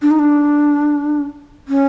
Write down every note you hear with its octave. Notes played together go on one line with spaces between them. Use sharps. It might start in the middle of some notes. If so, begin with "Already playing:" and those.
D4
D#4
D4
C#4